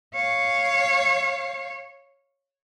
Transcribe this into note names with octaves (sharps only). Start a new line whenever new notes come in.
C#5 F5